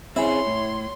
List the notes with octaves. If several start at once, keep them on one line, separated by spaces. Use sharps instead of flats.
C4 C#4 E4 G#4 C#5 C6
A2